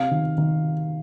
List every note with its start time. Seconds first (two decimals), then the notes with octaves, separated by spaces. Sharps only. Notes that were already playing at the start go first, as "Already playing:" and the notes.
Already playing: C3 F5
0.11 D#3
0.38 D#3